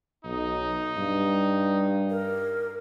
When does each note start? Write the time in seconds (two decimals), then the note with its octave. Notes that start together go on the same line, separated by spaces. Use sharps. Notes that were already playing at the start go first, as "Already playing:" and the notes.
0.24 B1 D#4
0.97 G2
2.10 A#4